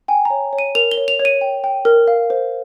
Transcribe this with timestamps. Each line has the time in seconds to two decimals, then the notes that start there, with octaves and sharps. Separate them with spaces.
0.08 G5 G#5
0.25 C#5 A#5
0.53 C#5
0.58 D#7
0.75 A#4 F7
0.91 G7
0.97 C#5
1.08 F7
1.20 C#5
1.25 D#7
1.41 G5
1.64 G5
1.85 A#4
2.08 F5
2.30 C5